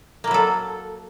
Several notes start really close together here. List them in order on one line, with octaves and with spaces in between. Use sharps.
A#3 E4 F#3 A4